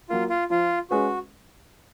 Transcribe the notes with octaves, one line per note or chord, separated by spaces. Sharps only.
F#3 A#3 F4
F4
F3 F4
G#3 C#4 F#4 G#4 B4